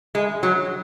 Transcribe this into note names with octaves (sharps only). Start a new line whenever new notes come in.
G#3
F#3